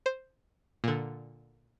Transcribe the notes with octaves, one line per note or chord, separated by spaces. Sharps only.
C5
A#2 D3